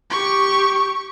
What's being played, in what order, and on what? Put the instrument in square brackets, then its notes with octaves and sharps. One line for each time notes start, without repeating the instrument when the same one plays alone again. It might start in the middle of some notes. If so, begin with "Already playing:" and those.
[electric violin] G4 C#6